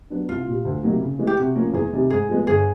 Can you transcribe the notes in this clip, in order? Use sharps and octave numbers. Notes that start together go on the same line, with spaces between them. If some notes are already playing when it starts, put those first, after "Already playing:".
F#3 B3 D4
C2 F4
A#2 G3
D2
C3 D#3 F#3 A#3
C#3
E3 G#3
G4
C3 F#4
F3 A#3 C#4
E2 G#4
C3 D#3 G3
G#2 G#4
F3 G#3 B3
G1 G#4